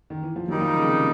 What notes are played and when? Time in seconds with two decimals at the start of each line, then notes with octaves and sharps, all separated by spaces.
0.10 D#3
0.23 E3
0.36 F3
0.48 D#3 F#3 G3 A#3 D#4
0.62 F3
0.76 C#3
0.88 C3